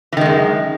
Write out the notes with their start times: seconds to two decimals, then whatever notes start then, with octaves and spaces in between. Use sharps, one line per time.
0.12 E3
0.17 D#3
0.21 G#3
0.26 F#2